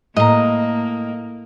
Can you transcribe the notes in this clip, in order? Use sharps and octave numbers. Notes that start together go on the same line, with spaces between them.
A2 A#3 D#5 A#5